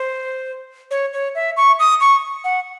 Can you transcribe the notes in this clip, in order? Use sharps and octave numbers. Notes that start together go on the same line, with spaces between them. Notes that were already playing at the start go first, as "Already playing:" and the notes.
Already playing: C5
C#5
C#5
E5
C#6
D#6
C#6
F#5